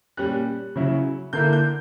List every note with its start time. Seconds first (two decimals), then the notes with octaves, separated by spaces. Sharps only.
0.17 A#2 G3 C#4 F#6
0.75 C#3 F#3 C#4 E4
1.33 D3 A#3 E4 G6
1.53 G6